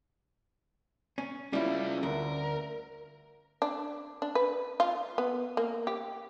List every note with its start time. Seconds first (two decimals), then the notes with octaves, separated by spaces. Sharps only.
1.18 C#4
1.53 G3 C#4 E4 F4
2.03 D2 A#4
3.62 D4
4.22 D4
4.35 B4
4.80 F4
5.18 B3
5.57 A#3
5.87 G4